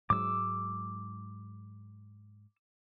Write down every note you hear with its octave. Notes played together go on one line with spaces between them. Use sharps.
G#2 F#3 G#3 D6 E6